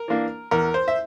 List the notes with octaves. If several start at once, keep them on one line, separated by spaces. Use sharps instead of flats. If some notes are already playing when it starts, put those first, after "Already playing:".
Already playing: A#4
E3 A#3 D4
E2 A#4
C5
E5